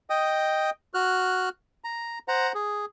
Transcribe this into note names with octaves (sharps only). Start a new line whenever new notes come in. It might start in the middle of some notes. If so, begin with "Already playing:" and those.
D#5 G5 D#6
F#4 F6 F#6
A#5
C5 F#5 A#5
G#4